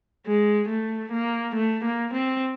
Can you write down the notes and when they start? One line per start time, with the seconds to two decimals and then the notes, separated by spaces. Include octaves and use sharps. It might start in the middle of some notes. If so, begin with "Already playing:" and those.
0.26 G#3
0.69 A3
1.12 A#3
1.56 A3
1.85 A#3
2.14 C4